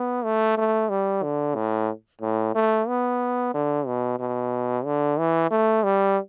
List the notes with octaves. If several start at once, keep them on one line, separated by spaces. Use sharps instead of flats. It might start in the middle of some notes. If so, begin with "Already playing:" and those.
Already playing: B3
A3
A3
G3
D3
A2
A2
A3
B3
D3
B2
B2
D3
E3
A3
G3